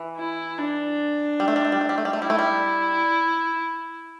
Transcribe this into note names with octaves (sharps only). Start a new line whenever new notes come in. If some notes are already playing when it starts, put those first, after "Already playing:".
Already playing: E3
E4
D4
G3
A3
G3
A3
G3
A3
G3
A3
G3
A3
G3 E4
A3
G3